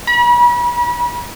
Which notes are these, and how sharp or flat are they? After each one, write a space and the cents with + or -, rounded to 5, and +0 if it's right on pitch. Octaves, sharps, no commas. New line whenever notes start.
B5 -40